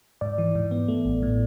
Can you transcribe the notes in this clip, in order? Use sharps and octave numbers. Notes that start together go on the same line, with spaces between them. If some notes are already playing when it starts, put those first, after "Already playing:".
G#2 D5
E3
G#2
B3
A3
A1
A2